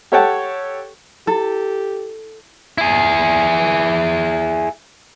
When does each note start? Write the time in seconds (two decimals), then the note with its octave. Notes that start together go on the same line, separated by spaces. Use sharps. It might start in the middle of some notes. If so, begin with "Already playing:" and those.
0.12 G4 A4 C#5 F#5 G5 A5
1.27 E4 G4 A4
2.78 E4 G#4